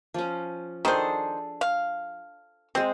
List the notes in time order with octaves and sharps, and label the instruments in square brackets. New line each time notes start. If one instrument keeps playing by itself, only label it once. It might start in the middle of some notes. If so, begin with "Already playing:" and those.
[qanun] F3 C#4
[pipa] D#3 C5 [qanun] D4 G#4 A4
[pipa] F5
[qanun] G#3 C5 [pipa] C4